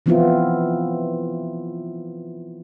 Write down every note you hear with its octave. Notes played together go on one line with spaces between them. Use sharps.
E3 F3 B3 C4 E4 F4